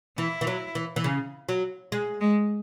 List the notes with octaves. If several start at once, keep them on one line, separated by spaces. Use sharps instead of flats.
E3 E4
E3
F#3
E3
E3
C#3
F#3
G#3
G#3